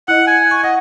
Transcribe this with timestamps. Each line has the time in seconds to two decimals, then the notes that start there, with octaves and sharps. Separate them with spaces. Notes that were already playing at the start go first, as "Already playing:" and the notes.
0.08 E4 D#5 F#5
0.27 G#5
0.51 C#6
0.64 D#5 F#5